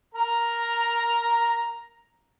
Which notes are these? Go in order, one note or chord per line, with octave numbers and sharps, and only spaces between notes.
A#4 A#5